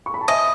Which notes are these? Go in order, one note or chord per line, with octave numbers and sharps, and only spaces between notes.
C#6
B5
A5
D#5 E5 G#5